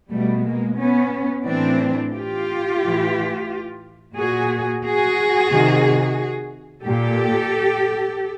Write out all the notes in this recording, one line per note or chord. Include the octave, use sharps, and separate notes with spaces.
B2 G3 A3
G#3 A#3
B3 C#4
A2 E3 C4 D4
F4 G4
A2 E3
A#2 F#4 G#4
F#4 G#4
C3 D#3
A#2 G4 A4